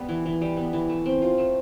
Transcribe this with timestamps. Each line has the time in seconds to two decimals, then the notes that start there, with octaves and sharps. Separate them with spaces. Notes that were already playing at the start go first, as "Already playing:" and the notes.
Already playing: G3 B3
0.09 E3
0.26 E3
0.41 G3
0.57 B3
0.73 E3
0.89 A3
1.06 C4
1.22 F4
1.38 A3